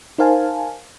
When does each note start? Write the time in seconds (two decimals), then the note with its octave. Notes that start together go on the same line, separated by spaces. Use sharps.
0.18 D#4 A#4 C5 F5 G#5 A5